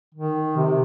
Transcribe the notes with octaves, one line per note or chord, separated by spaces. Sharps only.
D#3
C3